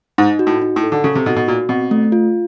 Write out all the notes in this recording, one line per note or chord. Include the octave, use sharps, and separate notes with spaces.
G#2 D#4
F#4
A2
D#4
A2
A4
D3
C#3 A4
C3
B2 D#4
B2
A#2 F#4
B2 C4
A3
F4